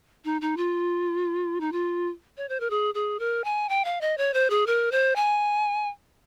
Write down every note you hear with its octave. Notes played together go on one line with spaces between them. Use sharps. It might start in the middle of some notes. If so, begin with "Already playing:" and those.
D#4
D#4
F4
D#4
F4
C#5
C5
A#4
G#4
G#4
A#4
G#5
G5
F5
D#5
C#5
C5
G#4
A#4
C5
G#5